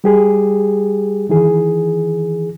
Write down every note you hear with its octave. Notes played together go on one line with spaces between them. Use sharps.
G3 G4 G#4
D#3 E3 G#4